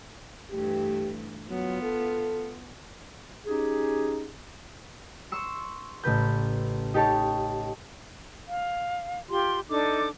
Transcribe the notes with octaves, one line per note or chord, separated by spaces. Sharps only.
G2 E3 A3 G4
F#3 B3 F4
A4
C#4 D#4 G4 G#4
C6 C#6 E6 C#7
A1 C#3 B4 G6
D#4 G4 A4 C#5 A5
F5
F4 G4 C6
D4 D#4 A4 D6